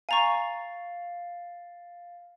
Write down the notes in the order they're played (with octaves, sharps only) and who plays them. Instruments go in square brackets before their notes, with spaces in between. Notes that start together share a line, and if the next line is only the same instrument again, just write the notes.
[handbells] F5 A6 [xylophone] G#5 A#5 C#6